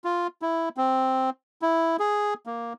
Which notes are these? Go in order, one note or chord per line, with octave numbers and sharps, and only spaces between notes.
F4
E4
C4
E4
G#4
A#3